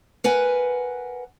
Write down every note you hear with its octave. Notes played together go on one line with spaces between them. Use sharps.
A#4 B4 F#5 G#5